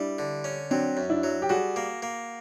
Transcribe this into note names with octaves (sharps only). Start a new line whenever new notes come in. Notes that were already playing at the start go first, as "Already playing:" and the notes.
Already playing: G3 D4 E4
D3
C#4
F#3 C4 D4
F#2
D4 E4
F#3
G4
G3 F#4 G#4
A#3
A#3